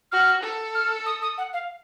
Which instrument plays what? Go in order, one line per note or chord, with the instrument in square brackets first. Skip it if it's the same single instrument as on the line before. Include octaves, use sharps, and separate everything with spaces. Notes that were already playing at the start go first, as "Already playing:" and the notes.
[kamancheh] F#4 [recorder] F6
[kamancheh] A4
[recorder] F6
D#6
D#6
F#5
F5